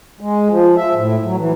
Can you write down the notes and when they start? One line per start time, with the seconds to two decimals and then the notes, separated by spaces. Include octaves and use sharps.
0.21 G#3
0.50 F3
0.77 E5
0.94 A2
1.25 F#3
1.37 E3